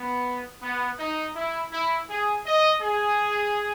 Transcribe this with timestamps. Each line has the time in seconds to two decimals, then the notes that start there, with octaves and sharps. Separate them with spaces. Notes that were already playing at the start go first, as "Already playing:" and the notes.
Already playing: B3
0.62 B3
0.99 D#4
1.35 E4
1.72 E4
2.10 G#4
2.46 D#5
2.82 G#4